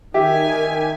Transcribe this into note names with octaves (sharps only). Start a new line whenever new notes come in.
D#3 G4 E5 G#5